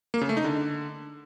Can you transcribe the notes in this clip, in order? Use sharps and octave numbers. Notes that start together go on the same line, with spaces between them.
A#3
C#3
A3
D#4
D3